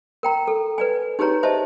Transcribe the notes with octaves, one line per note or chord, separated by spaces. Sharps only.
A#4 G5 A#5
A4
B4 D5 G#5
D#4 G4 G#4 B4 C#5 A#5
C5 D#5 E5 A5